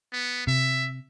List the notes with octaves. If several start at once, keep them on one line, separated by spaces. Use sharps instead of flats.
B3
C3 E5